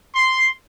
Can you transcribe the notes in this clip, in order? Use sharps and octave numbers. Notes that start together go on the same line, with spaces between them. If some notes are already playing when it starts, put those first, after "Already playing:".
C6